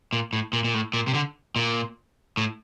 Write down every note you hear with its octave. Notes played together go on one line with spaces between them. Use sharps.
A#2
A2
A#2
A#2
A2
A#2
C3
D3
A#2
A2